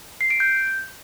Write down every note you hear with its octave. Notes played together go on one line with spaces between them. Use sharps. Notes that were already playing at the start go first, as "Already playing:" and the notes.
C7
D7
G6